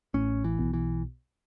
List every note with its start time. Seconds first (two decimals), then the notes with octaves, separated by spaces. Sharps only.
0.14 A1 A2 C#4
0.44 E3
0.58 B1 B2
0.73 E3